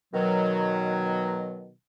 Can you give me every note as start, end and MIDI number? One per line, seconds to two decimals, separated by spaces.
0.14 1.71 47
0.14 1.71 51
0.14 1.71 54